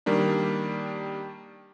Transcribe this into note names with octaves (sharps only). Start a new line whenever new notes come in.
D#3 G3 A#3 D4